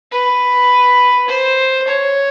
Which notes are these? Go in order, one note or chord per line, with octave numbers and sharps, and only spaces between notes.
B4
C5
C#5